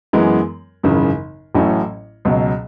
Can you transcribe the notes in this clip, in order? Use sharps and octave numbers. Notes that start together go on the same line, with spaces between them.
F#2 E3 G#3 B3
G#1 F#2 C#3 E3
A1 A2 F#3 A3 C#4
C#2 B2 F#3